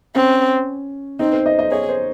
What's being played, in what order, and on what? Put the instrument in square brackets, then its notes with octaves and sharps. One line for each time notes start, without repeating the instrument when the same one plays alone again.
[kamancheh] C4 [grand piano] C#4
[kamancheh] C4 [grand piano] D#4
[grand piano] C5
D#5
D#5
[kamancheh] G#4 [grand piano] C#5
[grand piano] C5